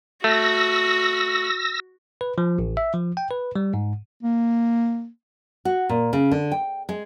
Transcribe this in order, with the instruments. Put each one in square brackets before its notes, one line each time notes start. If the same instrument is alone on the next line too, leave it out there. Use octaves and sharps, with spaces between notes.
[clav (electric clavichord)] A3 [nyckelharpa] F#4 [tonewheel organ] E6 A#6
[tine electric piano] B4
F3
A1
E5
F3
G5
B4
G3
G#2
[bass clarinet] A#3
[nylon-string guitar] F#4
A#2
C#3
D3
G5
G#3